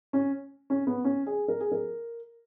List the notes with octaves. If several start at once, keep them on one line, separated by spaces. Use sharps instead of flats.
C#4
C#4
B3
C#4
G#4
A#4
G#4
A#4